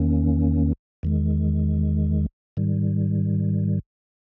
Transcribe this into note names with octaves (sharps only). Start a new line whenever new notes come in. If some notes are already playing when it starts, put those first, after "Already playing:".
Already playing: E2 D#3 A#3 C#4
E2 D#3 G#3
G#2 D#3 G3